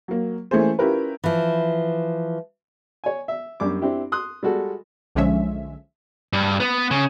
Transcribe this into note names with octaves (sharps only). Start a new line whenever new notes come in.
F#3 A#3
E3 A3 A#3 C#4 G#4 C5
C#4 E4 F4 G4 A#4 B4
E3 F3
C#5 G#5
E5
F#2 G3 D4 D6
C4 D4 E4 G4
C6 D#6 F#6
G3 G#3 F#4 A4
B1 D3 F3 G#3 C#4 E5
G2
B3
C#3